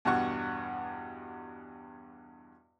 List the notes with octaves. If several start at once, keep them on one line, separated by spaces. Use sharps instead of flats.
E2 G2 B2 F#4 F#5 C#6